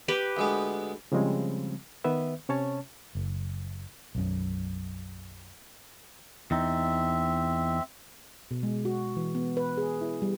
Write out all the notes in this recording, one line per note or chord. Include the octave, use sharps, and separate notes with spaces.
G4 B4
D2 G#3 B3
C#3 F3 G3 G#3 C4
D#3 B3 B4 E5
C3 C#4 C#5 A5
F#1
B1 F#2
E2 C4 D#4 E5
B2
G#3
F#4
E3
B3
B4
G#4
E4
G3